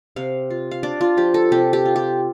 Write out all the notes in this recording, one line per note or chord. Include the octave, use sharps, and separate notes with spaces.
C3 F5
F4
F5
D4 D5
F4
F3 G4
A4
C3 G4
G4
F4
G4